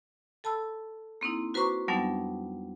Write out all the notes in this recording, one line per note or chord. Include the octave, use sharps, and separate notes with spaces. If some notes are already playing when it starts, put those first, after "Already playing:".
A4 A5 B5 E6
A#3 C4 D#4 E4
F#4 B4 C5 A#5 C#6 D6
F2 F#3 G3 B3 D4 D#4